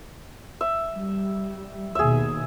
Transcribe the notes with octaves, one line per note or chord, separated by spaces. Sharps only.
E5
G3
D#2 B2 G#4 E5